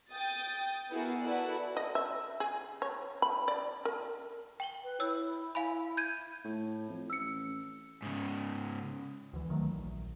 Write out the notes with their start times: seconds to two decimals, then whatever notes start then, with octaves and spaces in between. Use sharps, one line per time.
0.10 G5 D#6 A6
0.90 B3 E4 F#4 G#4 A#4
1.21 E4 F#4 A4 B4 D5 F#5
1.77 D#5
1.95 E5
2.40 G#4
2.82 C#5
3.22 B5
3.48 D5
3.85 A#4
4.60 G5 F#7 G7
4.83 B4
5.00 E4 C#5 E6
5.55 E4 F5 G#5 B5
5.97 G6 G#6 D#7
6.44 A2
6.89 F2
7.10 A1 E6 C#7
8.02 G#2 C#3
9.33 D2 E3
9.49 C#2 D#3 F#3 A3
9.71 A#1